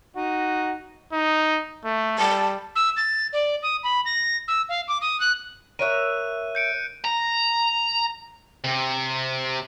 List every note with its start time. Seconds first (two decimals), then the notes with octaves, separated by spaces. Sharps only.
0.16 D#4 F#4
1.13 D#4
1.85 A3
2.19 G3 A5
2.76 E6
2.97 A6
3.33 D5
3.63 D#6
3.84 B5
4.06 A#6
4.48 E6
4.69 F5
4.88 D6
5.02 D#6
5.20 F#6
5.79 A#4 C#5 E5 F#6 D#7
6.55 G6 C#7 D7
7.05 A#5
8.64 C3